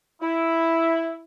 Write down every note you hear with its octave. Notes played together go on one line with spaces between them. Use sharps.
E4